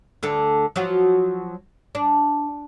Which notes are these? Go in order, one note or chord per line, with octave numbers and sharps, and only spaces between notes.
D2 D3 A4
F3 F#3 F#4
D4